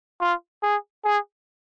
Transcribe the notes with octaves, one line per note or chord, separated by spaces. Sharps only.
F4
G#4
G#4